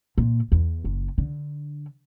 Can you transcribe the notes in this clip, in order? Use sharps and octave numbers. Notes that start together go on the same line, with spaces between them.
A#2
E2
F#1
D3